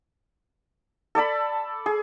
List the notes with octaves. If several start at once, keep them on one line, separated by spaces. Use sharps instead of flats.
A4 D5 A5 B5
G#4